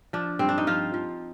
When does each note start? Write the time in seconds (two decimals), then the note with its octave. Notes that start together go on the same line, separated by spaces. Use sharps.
0.13 F3 D4
0.39 G2 C4
0.49 D4
0.58 D#4
0.67 F3 F4
0.94 F3